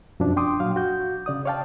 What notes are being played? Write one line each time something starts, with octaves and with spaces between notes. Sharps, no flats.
F#2 B2 F3 F#3 D4
D4 G5 C6 D6 D#6
A#2 F#3 F5
F#4 G6
C#3 D5 D#6
C#5 D5 F5 G5 A5